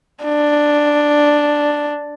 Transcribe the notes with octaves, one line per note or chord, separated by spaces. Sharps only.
D4